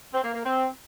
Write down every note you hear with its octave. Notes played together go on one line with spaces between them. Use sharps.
C4
A#3
A#3
C4